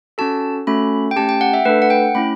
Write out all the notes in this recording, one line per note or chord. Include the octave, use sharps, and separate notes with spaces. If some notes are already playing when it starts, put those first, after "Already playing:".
C#4 F#4 A4 A5
A3 C#4 F#4 A4 B5
G5
A3 C#4 G4 A5
G5
F#5
E5
A3 D4 A4 B4
F#5
G5
A3 C#4 E4 B5